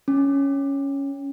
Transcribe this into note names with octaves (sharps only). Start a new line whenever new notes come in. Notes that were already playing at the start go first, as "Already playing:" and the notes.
C#4